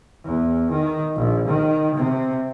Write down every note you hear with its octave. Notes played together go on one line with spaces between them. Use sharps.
E2
D#3
A#1
D#3
C3